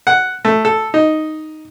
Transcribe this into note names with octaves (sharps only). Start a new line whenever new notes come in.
F#5
A3
A4
D#4